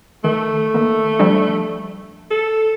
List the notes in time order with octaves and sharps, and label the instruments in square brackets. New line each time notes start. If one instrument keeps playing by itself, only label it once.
[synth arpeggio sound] D#3 [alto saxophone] A3
[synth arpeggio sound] D#3 A#3
F3 G3 D4
[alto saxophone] A4